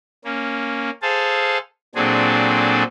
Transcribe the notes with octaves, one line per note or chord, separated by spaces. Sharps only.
A#3 C#4
G#4 A4 C5 F5 A5
A#2 F#3 C4 D4 G#4 A4